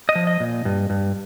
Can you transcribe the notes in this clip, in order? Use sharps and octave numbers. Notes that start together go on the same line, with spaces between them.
D#5
F3
D#5
A#2
G2
G2